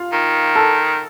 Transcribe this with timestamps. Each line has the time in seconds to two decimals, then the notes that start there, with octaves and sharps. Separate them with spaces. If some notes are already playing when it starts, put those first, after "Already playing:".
Already playing: F4 F5
0.12 D#3
0.55 A4 A5